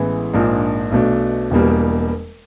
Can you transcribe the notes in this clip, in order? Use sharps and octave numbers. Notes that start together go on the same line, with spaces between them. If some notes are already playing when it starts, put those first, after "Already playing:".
Already playing: A1 A2 E3 G#3 B3
A#1 G#2 F3 A#3 D4
B1 B2 F#3 A3 D4
E1 E2 B2 G3 A#3